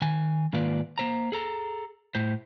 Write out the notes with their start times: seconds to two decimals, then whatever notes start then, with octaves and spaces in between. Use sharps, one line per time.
0.02 D#3 G#5
0.53 G#2 D#3 A#3 F4 B4 D5
0.98 A#3 C5 A#5
1.32 G#4 A4 A#5
2.15 A2 C5